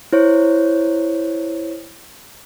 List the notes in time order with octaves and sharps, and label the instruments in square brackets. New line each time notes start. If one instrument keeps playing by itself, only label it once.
[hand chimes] E4 C5 C#5